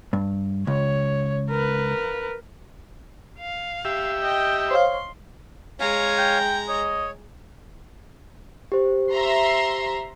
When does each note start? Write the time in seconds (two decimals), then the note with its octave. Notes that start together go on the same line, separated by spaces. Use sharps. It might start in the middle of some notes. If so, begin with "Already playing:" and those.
0.13 G2
0.67 C#2 C#5
1.49 A#4 B4
3.39 F5
3.85 G4 E5
4.21 D#5 G5
4.71 C5 C#5 F5 C6
5.80 G#3 C#5 F5 G#5 A#5
6.18 G5
6.68 C#5 D#5
8.72 G4 C5
9.12 E5 A#5 C6